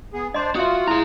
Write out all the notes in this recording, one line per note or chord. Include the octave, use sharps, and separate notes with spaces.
B3 G#4
D4 C5 D5 D#5 C6
F4 F#4 E5 D#6
E4 G#4 A#5